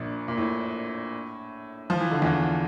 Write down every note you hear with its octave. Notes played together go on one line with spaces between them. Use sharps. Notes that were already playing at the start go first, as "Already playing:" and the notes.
Already playing: A#1 A#2
A#2
A2
F3
E3
D3
E2 E3